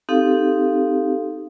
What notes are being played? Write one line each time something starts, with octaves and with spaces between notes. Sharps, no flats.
C4 D#4 G4 A4 F5